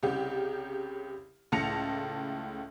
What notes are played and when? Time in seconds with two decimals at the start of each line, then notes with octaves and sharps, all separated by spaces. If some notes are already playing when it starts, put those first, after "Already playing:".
0.03 C2 C#3 G4
1.52 C#2 A2 A5 A#6 C#7 F7